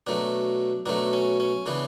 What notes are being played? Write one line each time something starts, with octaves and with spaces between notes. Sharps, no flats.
B2 F#3 A3 D4
B2 F#3 A3 D4
C#4
C#4
C#3 E3 B3 D4